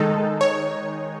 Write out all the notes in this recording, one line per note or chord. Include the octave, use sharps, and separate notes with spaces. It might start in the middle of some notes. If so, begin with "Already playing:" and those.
Already playing: D#3 G#3 D#4 A4
C#5